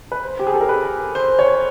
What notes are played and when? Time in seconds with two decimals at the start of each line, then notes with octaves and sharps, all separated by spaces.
0.12 B4
0.23 C5
0.39 G4
0.47 G#4
0.54 A4
0.61 A#4
0.69 B4
1.15 C5
1.39 C#5